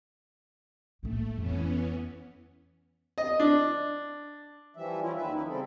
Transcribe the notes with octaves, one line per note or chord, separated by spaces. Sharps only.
A2 A3 A#3
F2 E3 B3 C#4
D#5
D4
E3 F3 G3 E5
F3 C#4 E4 F4
D#2 D#3 B4 E5
E3 C#4 D#4 E4
C#3 G3 C4 A4